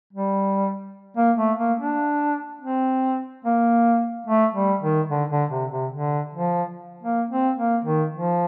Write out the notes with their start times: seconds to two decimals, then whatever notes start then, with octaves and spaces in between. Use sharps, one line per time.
0.13 G3
1.17 A#3
1.38 A3
1.58 A#3
1.79 D4
2.61 C4
3.45 A#3
4.27 A3
4.54 G3
4.82 D#3
5.09 D3
5.30 D3
5.51 C3
5.71 C3
5.92 D3
6.34 F3
7.03 A#3
7.30 C4
7.57 A#3
7.85 D#3
8.13 F3